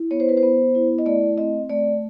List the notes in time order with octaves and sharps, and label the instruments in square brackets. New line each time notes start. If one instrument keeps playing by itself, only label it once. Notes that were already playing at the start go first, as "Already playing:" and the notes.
Already playing: [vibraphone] E4
B3 C#5
C5
B4
C5
B3
E4
D#5
A3 D5
C4 D#5
A3 D5